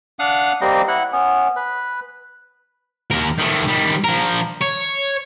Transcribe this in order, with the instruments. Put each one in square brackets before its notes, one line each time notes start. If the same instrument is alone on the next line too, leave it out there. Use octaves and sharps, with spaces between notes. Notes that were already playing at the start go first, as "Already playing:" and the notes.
[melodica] D4 F5 F#5 D#6
G3 A#3 C4 D#5
E4 F#5
B3 C#4
B4
[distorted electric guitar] D#2 A#4
D#3 A3
D#3 G3
F3 A#4
C#5